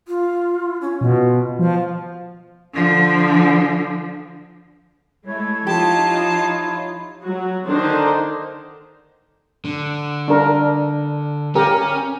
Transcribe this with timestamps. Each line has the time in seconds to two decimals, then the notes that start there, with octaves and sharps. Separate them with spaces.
0.08 F4
0.81 C#4
1.01 B2 F4
1.59 F3 F5
2.73 D3 F3
5.27 G#3 A3 E4 C#5
5.67 F3 D#4 F4 G4 A5
7.23 F#3 F#4
7.67 D3 D#3 D4 D#4 C5
9.65 D3
10.28 D4 A#4
11.55 C#4 G4 A#4